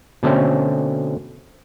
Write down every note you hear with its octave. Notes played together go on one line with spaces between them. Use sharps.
B2 D3 A3 C4 C#4